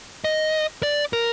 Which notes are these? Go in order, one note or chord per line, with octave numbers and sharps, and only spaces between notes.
D#5
D5
A#4